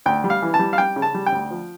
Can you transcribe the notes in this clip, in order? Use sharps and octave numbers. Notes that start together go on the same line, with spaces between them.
D2 G5
G3
F5
E3
A5
G3
F5
G3 G5
C#3
A5
G3
G5
D2
F3